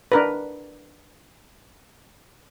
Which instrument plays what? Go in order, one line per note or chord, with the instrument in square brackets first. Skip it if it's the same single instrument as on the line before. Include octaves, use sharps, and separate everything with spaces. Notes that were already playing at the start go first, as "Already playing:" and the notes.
[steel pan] D4 A#4 B4